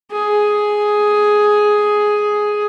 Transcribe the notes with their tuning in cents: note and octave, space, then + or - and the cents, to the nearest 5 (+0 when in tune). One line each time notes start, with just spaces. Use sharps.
G#4 +5